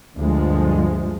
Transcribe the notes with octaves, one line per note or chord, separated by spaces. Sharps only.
D2 G2 F3 G#3